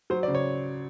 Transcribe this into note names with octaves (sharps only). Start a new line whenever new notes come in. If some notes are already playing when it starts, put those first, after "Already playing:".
F#3 C5
C#3 D5
C#5